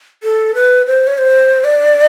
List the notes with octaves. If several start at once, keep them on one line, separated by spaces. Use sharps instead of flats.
A4
B4
C5
C#5
C5
D5